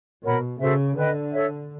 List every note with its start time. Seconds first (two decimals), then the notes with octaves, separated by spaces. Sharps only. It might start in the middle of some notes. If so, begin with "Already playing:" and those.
0.24 B2 A#4 C#5 F#5 B5
0.60 C#3 F#4 A4 C5 E5
0.96 D3 B4 D#5 G5
1.33 A4 C#5 E5